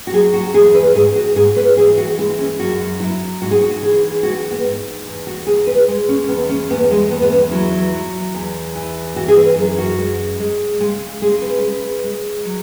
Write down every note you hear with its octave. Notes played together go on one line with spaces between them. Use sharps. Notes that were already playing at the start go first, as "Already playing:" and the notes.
F#4
F#3 G#4
F#4
E2 G#4
B4
G#2 G#4
F#4
G#2 G#4
B4
E3 G#4
F#4
G#3 E4
C#4
F#2 F#4
F#3 E4
G#2 F#4
G#4
F#4
E3 G#4
G#3 F#4
B3
G#2
E2
F#4
E2 G#4
B4
G#3
C#4
E2 B3
C#4
E2 B3
G#3
E2 B3
B3
C#4
F#3 E4
F#3
E2
E3
E3 F#4
G#4
B4
F#2
F#4
G#3
G#3
C#3 G#3
G#3 G#4
B4
G#3
G#3
F#3